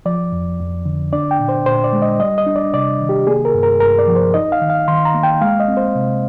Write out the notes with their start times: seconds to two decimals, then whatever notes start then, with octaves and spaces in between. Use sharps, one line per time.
0.05 F3 D5
0.32 F2
0.59 F2
0.86 D3
1.13 D4 D5
1.31 G5
1.39 A#2
1.49 C5
1.66 A#2 C5
1.84 D5
1.93 G#3
2.02 D#5
2.20 G3 D#5
2.38 D#5
2.47 D4
2.56 D5
2.73 C3 D5
3.01 D#3
3.09 G4
3.27 A#3 G#4
3.45 A#4
3.54 G2
3.63 A#4
3.80 G2 A#4
3.99 D5
4.08 F3
4.16 C5
4.34 D#4 D#5
4.52 F5
4.61 D#3
4.70 F5
4.88 D#3 C6
5.05 A#5
5.15 A#3
5.23 G5
5.41 G#3 F5
5.60 D#5
5.68 C4
5.77 C5
5.95 C3